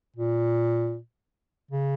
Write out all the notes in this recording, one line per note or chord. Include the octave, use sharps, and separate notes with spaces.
A#2
C#3